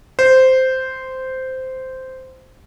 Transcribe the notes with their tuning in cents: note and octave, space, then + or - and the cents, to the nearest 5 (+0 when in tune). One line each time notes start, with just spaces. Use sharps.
C5 -10